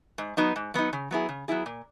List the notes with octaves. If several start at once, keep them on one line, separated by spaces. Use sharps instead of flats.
G#2
F#3 B3 D#4
G#2
F#3 B3 D#4
C#3
F#3 B3 E4 G#4
C#3
F#3 B3 E4 G#4
A#2